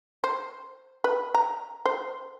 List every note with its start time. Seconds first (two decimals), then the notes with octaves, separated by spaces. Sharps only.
0.24 C5
1.04 B4
1.34 A#5
1.86 C5